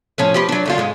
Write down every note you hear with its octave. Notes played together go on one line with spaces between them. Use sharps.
A2 F3 C#4
F3 G4 B4
F#3 D4
F#2 D3 F4
G#2 G#3